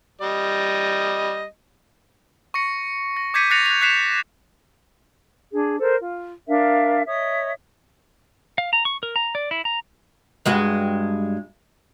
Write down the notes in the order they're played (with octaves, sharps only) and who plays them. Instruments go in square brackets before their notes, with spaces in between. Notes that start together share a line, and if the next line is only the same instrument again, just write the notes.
[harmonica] G3 D#5
[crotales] C#6 A#6 C#7
A#6
D6 G6 G#6 B6 C#7 D#7
F#6 A6 A#6 C7 C#7 F7
F#6 F7
F#6 G6 B6 C7 E7 F7
[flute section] D4 G#4
A4 A#4 C5
F4
D4 A#4 E5 F5
C#5 D#5 E5 D#6
[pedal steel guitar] F5
A#5
C#6
A#4
A#5
D5
E4
A#5
[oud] G2 G#3 F#4